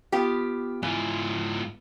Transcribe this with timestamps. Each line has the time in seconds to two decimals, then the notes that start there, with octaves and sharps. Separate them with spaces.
0.12 B3 F4 G4
0.83 G#2 E3 F4